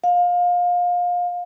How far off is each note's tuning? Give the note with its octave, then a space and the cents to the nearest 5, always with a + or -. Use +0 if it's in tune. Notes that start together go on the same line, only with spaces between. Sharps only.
F5 +25